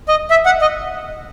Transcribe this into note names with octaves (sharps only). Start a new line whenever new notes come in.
D#5
E5
F#5
D#5